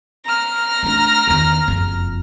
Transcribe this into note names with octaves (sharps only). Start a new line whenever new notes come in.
A#5 F6
A3 D4
E2 D#3
F#1 F2